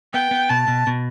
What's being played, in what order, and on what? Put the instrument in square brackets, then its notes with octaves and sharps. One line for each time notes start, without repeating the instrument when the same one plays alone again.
[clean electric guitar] B3 [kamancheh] G5
[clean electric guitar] B3
[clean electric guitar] B2 [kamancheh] A5
[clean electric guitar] B2
B2